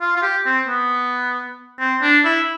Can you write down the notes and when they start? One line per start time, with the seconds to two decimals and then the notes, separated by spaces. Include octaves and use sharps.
0.01 F4
0.16 F4
0.22 G4
0.46 C4
0.68 B3
1.80 C4
2.02 D4
2.24 E4